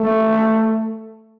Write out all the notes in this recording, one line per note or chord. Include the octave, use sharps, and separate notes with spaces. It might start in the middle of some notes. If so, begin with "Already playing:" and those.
Already playing: A3